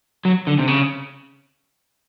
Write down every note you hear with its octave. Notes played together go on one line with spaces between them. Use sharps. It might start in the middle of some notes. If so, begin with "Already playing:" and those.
F#3
D3
C3
C#3